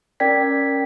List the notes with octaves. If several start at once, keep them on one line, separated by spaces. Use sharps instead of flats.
C#4 A#4 D5 G5 G#6 B6